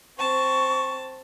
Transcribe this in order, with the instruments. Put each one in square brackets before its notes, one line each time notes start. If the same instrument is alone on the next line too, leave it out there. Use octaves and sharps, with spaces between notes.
[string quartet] C4 A5 [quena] C#6